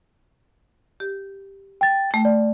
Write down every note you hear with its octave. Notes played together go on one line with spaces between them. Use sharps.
G4
G5 A6
A3 G5
D5